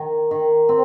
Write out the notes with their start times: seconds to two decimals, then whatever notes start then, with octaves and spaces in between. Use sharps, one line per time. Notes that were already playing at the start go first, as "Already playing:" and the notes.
Already playing: D#3
0.31 D#3
0.69 C4